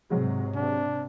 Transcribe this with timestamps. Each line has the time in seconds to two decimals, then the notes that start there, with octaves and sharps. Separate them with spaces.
0.10 G#2 C3 F#3 G#3
0.55 C3 D4